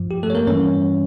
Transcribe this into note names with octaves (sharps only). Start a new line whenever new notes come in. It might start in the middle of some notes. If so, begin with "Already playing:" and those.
Already playing: G2 F3
G4
A3 A4
C#5
A#3 A#4
G2 E3 G3 C#4 C#5